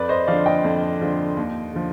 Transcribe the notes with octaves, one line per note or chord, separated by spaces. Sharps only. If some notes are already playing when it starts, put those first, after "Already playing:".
Already playing: F2 B4 D5
C5 D#5
D3 F3 D5 F5
D#5 G5
F2
D3 F3
D#2
D3 F3